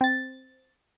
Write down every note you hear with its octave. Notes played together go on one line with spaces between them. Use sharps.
C4 A6